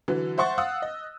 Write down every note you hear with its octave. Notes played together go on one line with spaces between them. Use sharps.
D3 E3 F#3
C5 E5 F#5 C6 C#6 A6
F5 F#5 D#6 E6 F#6
D#5